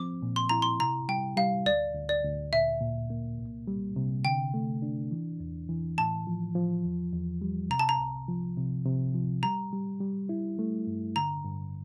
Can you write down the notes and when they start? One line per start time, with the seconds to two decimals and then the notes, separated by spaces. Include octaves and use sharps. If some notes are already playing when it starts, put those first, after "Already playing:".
Already playing: F3 C4 D6
0.22 A#2
0.36 C6
0.49 E4 A#5
0.62 C6
0.80 C3 A#5
1.09 G3 G5
1.37 G3 F5
1.66 D2 D5
1.95 D2
2.09 D5
2.24 D2
2.53 A#2 E5
2.81 A#2
3.10 A#3
3.39 C2
3.68 G3
3.96 C3
4.25 D3 G5
4.54 A3
4.82 D4
5.11 E3
5.40 E2
5.69 E3
5.98 A2 A5
6.27 F3
6.55 F3
6.85 E2
7.13 E2
7.42 G3
7.70 C3 A#5
7.79 A5
7.89 A#5
7.99 C2
8.28 F3
8.57 C3
8.85 C3
9.14 F3
9.43 G3 A#5
9.73 G3
10.00 G3
10.29 E4
10.59 A3
10.87 G2
11.16 D3 A#5
11.44 G2